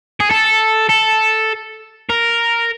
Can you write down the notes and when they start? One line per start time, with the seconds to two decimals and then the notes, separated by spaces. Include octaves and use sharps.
0.20 G#4
0.30 A4
0.90 A4
2.09 A#4